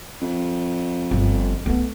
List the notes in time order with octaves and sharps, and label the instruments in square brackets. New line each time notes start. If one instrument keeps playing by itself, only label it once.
[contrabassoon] F2
[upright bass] G1
A3 B3